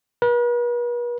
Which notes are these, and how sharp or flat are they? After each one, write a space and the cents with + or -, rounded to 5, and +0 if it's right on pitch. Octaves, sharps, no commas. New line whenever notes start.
B4 -45